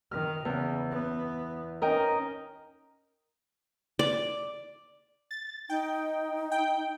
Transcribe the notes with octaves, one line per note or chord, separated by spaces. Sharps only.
D#3 F6
E2 C#3
B3
C#4 D#4 A#4 D#5 G5
D5
A6
D#4 G5
G5